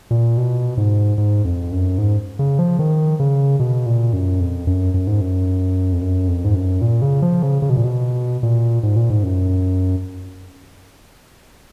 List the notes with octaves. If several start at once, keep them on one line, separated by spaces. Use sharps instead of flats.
A#2
B2
G#2
G#2
F2
F#2
G#2
C#3
F3
D#3
C#3
B2
A#2
F#2
F2
F#2
F#2
G#2
F#2
F2
F#2
F2
G#2
F#2
A#2
C#3
F3
C#3
C#3
B2
A#2
B2
A#2
G#2
A#2
G#2
F#2